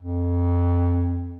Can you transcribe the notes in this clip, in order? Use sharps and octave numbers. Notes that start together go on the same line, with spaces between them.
F2